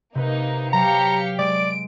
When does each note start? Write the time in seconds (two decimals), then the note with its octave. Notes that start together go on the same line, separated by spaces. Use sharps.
0.15 C3 A#3 D#4 B4
0.73 F#3 G4 F5 A#5 C#7
1.38 G#3 D5 D7